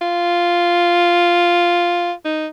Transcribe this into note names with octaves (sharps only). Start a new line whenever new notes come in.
F4
D#4